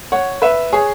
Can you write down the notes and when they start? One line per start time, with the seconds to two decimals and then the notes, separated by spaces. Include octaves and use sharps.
0.12 C#5 F#5
0.42 B4 E5
0.72 G#4 C#5